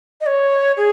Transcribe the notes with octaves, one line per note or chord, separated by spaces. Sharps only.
D#5
C#5
G#4